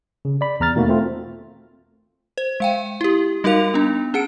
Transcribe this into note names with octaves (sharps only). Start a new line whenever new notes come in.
C#3
D5 B5
E2 A#5 F6 A6
B2 D#3 A3 A#3 F#4
A3 C4 F4
C5
G#3 F5 G5
E4 G4
G3 D#4 F#4 A#4 F5 F7
B3 D4
C#4 G#4 F#5 C#7 D7